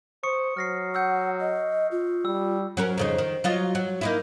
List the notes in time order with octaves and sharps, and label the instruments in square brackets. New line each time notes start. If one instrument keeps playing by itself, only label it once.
[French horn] C5 [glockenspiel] C#6 D#6 C#7
[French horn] F#3 [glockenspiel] F6 A#6 C7
[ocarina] F#5 [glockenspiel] E6 G6 C#7
[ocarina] D#5
F4
[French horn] G3 [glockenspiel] E6
[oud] F#3 C#4 A#4
F2 C#3 D#4
D#3
F#3 F4 D#5
F#3
A#3 D#4 E4